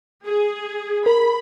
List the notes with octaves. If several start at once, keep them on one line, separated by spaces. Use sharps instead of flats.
G#4
A#4 B5